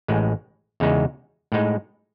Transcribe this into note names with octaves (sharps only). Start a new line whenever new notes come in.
A1 A2 G#3
E2 C#3 G#3 D#4
A2 G#3 D#4